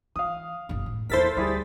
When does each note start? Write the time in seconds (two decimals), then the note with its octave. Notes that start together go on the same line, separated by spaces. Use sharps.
0.16 E3 F5 D#6
0.69 F#1 B1
0.86 A2
1.10 E2 A#3 E4 A4 A#4 C5 A6 B6
1.37 D2 G3 E4 G#4